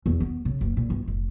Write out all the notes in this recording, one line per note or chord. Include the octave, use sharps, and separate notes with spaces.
E2
B3
C#3
F#1
A#2
G1
F1